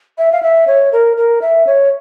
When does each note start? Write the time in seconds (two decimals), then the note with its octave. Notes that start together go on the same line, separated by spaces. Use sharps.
0.18 E5
0.32 F5
0.42 E5
0.67 C#5
0.92 A#4
1.17 A#4
1.41 E5
1.67 C#5